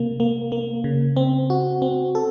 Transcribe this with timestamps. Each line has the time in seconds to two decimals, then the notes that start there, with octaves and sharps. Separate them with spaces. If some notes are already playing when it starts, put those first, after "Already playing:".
Already playing: C3 A#3
0.20 A#3
0.52 A#3
0.84 C#3
1.16 C4
1.50 F#4
1.82 C4
2.15 A4